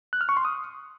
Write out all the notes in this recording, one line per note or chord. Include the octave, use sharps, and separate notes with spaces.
F#6
F6
C#6
C6
D#6